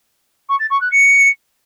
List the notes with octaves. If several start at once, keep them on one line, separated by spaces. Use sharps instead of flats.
C#6
A6
C#6
F#6
C#7